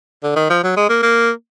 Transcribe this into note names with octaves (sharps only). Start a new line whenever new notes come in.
D3
D#3
F3
F#3
G#3
A#3
A#3